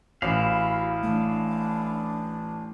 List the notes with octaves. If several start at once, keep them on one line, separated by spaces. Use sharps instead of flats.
A1 E4 F#4 F5
E3 A3 D4